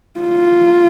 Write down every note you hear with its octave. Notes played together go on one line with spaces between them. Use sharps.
F4